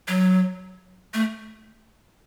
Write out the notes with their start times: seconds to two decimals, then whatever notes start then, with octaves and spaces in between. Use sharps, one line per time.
0.08 F#3
1.14 A3